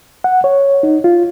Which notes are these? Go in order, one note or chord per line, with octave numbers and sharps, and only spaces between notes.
F#5
C#5
D#4
F4